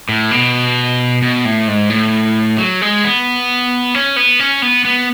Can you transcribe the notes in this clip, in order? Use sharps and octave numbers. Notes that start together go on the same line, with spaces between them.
A2
B2
B2
A2
G#2
A2
F#3
G#3
B3
C#4
B3
C#4
B3
B3